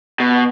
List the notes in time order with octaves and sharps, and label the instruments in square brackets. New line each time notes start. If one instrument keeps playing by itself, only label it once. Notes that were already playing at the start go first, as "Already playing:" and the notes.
[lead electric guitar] B2